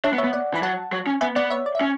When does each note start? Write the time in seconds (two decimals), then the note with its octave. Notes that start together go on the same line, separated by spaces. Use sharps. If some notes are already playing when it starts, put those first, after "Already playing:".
0.04 D4 C#5 E5
0.13 B3
0.18 C#5 E5
0.24 B3
0.33 D5 F#5
0.54 E3 B5
0.63 F#3 F#5 A5
0.92 F#3
1.06 C#4
1.21 B3 E5 G#5
1.36 B3 D5 F#5
1.50 C#5 E5
1.66 D5
1.75 E5
1.81 C#4